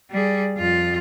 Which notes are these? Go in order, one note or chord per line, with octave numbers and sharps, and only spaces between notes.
G3 G#4
F2 F4